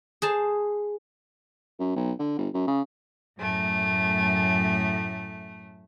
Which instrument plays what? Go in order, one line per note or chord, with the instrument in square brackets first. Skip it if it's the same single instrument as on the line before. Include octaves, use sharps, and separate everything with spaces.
[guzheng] G#4 C5 A5
[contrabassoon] F#2
B1
D3
G1
F#2
C#3
[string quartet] F#2 A2 A3